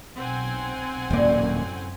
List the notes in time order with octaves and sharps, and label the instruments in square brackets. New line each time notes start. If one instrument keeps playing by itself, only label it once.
[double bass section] B1 [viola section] C4 F#5 G#5
[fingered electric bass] D#1 A#3 [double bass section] F#2 [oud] A2 C3 D5